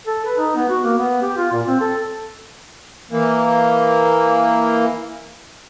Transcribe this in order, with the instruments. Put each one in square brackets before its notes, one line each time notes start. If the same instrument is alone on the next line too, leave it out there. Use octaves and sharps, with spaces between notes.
[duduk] A4
B4
D#4
B3
F#4
A#3
B3
G4
F4
A#2
C4
A4
[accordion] E3 A#3